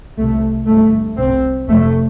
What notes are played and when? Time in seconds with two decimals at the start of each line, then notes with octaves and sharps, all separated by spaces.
0.18 C2 C3 A3
0.68 G1 G2 A3
1.18 C2 C3 C4
1.69 F1 F2 C3 A3